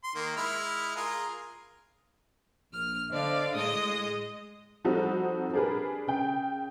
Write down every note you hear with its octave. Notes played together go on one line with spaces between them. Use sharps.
C6
D#3 A#3
G#3 E4 F6
F4 G#4 A#4
A#1 F6
D3 B3 C5 D5 D#5 F5
A2 G#3 G#4 D#5 D#6
F3 G3 C4 D#4 F#4 A4
D4 G4 G#4 A#4 B4
C#3 G5